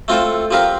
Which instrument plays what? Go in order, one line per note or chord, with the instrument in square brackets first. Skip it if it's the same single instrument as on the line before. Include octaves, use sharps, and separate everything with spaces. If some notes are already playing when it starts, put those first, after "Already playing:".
[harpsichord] A3 C4 F4 A4 C5
F3 C4 G4 A#4 F5